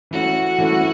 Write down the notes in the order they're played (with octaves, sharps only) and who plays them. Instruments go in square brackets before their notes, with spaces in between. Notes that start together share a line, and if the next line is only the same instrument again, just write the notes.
[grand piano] E3 A3 C#4 [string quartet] F#4
[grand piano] E3 A3 C#4